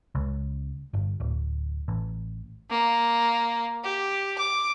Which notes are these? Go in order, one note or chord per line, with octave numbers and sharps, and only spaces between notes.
C#2
G1
D1
A1
A#3
G4
D6